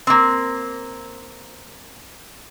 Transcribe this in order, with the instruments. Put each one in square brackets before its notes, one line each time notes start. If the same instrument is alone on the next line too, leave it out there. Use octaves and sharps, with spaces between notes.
[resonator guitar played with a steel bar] A#3 C4